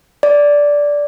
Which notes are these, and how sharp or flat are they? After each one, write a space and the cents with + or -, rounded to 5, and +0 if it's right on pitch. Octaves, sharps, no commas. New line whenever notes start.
D5 -10